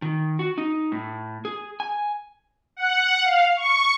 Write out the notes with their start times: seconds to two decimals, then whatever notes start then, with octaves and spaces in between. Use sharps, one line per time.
0.02 D#3
0.39 F#4
0.58 D#4
0.92 A2
1.45 G#4
1.80 G#5
2.76 F#5
3.25 F5
3.57 C#6